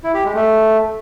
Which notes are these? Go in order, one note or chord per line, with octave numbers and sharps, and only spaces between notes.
E4
G4
G#3
A3